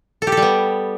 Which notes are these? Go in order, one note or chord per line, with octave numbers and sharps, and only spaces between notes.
A4
G4
A4
G3
B3